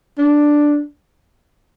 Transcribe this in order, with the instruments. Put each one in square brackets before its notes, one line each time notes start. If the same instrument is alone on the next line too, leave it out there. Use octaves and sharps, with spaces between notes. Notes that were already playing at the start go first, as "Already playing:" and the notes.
[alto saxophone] D4